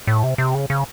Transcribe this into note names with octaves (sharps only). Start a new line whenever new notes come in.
A2
C3
C3
C#3
C#3